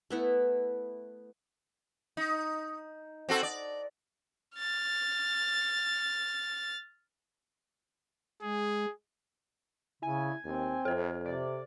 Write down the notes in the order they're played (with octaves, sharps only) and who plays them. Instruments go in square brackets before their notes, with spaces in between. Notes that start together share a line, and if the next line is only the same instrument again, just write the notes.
[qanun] A3 B3 E4
[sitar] D#4
C4 F#4 A4
D5
[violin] F6 A6
[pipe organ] G#3 [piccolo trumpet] G#4
[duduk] C#3 [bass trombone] E4 [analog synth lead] G#5
[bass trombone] D#2 [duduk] C4
[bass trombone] F2 [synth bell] A4 C5
[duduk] C3 [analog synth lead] D5